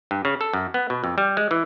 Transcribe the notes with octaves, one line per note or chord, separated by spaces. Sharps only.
G2
C#3
A4
F#2
B3
B2
F2
G3
G#3
E3